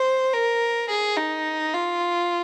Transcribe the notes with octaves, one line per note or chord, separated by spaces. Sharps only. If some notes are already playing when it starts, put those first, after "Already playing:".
Already playing: C5
A#4
G#4
D#4
F4